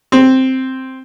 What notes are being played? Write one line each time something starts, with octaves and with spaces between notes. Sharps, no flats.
C4